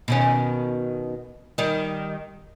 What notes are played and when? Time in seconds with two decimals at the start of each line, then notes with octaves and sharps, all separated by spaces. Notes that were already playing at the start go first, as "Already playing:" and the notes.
0.08 B2 D#3 C#4
1.58 D#3 G3